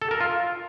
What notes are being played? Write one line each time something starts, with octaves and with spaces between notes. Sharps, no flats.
A4
A#4
F4